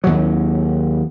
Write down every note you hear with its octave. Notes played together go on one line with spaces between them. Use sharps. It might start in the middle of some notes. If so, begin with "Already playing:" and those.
D#2 F#3